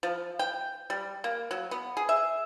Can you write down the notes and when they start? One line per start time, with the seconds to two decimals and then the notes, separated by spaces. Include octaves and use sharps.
0.03 F3
0.39 G5
0.90 G3
1.24 A#3
1.51 F#3
1.71 B3
1.97 G#4
2.09 E5